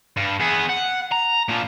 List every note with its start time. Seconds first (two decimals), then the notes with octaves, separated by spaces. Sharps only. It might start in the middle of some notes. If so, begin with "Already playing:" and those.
0.17 G2
0.40 B3 G#4
0.69 F#5
1.12 A#5
1.49 A#2 F3